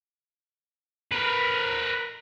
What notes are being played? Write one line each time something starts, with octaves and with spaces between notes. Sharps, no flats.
A#4 B4